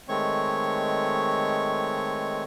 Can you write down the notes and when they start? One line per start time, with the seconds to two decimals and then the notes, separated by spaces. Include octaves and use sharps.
0.09 D#3 G#3 A3 C4 C#5 C#6